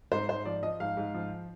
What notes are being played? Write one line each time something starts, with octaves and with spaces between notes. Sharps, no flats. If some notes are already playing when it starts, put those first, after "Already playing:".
G#2 C5
G#2 C5
F3 D5
F3 D#5
G#2 F5
G#2
F3